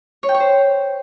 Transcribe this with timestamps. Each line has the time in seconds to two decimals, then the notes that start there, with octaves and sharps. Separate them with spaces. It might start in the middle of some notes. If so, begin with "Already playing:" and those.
0.23 C#5
0.29 G5
0.34 C#5
0.40 C5